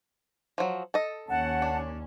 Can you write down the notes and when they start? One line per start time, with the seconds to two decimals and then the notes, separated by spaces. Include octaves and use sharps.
0.58 F3 F#3
0.94 A4 D#5
1.29 D#2 C#4 F#5 A5
1.62 D4